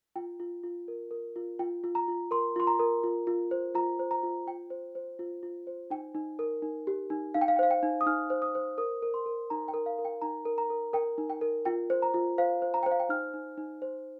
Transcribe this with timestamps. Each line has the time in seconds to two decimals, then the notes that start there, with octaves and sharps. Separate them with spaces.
0.16 F4 G5
0.40 F4
0.63 F4
0.88 A#4
1.11 A#4
1.36 F4
1.59 F4 G5
1.84 F4
1.95 A#5
2.08 F4
2.31 A#4 C6
2.56 F4 C6
2.67 A#5
2.79 A#4
3.03 F4
3.27 F4
3.51 C5
3.75 F4 A#5
3.99 C5
4.11 A#5
4.23 F4
4.47 F4 G5
4.70 C5
4.95 C5
5.19 F4
5.43 F4
5.67 C5
5.90 D#4 G5
6.15 D#4
6.39 A#4
6.62 D#4
6.87 G4
7.10 D#4
7.34 D#4 F5
7.41 G5
7.48 F5
7.56 G5
7.59 C5 F5
7.71 G5
7.83 D#4
8.01 D#6
8.06 D#4 F6
8.30 C5
8.42 D#6
8.55 C5
8.78 A#4 D#6
9.02 A#4
9.14 C6
9.26 A#4
9.50 D#4 A#5
9.68 G5
9.74 A#4
9.86 F5
9.99 A#4
10.05 G5
10.22 D#4 A#5
10.45 A#4
10.58 A#5
10.70 A#4
10.93 A#4 G5
11.18 D#4
11.30 G5
11.41 A#4
11.65 F4 G5
11.90 C5
12.02 A#5
12.14 F4
12.38 C5 F5
12.62 C5
12.74 A#5
12.83 C5 G5
12.91 F5
13.00 G5
13.09 D#4 F6
13.34 D#4
13.58 D#4
13.82 C5